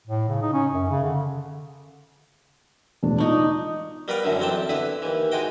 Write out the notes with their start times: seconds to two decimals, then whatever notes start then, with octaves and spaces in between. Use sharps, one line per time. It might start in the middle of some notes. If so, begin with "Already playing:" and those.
0.07 A2
0.29 C#3
0.42 D#4
0.53 C#4
0.74 F#2
0.90 C#3
1.04 D3
3.03 E1 A2 D4
3.18 D4 D#4 F4 C#6
4.08 G3 B3 A#4 B4 D5 F5
4.24 F#2 A2 D3 F#3
4.40 A1 F#3 C4 D5 G5 A5
4.69 D3 B3 E4 B4
5.02 D#2 E3
5.32 G#2 G#3 D#4 F#4 G5